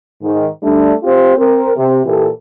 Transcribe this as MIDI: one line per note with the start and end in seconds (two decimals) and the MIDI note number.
0.22 0.47 44
0.22 0.47 51
0.62 0.94 55
0.62 0.94 57
0.62 0.94 62
1.03 1.35 60
1.03 1.35 65
1.03 1.35 67
1.03 1.35 72
1.37 1.72 60
1.37 1.72 70
1.76 2.00 48
2.05 2.29 46
2.05 2.29 52
2.05 2.29 67
2.05 2.29 69